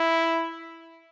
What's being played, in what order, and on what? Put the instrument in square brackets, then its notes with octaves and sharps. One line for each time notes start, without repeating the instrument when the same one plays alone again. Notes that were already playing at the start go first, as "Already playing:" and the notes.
Already playing: [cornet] E4